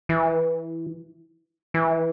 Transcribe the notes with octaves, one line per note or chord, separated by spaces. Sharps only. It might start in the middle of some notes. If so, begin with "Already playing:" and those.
E3
E3